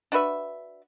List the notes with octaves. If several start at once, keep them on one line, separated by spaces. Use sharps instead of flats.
D4 F#4 B4 E5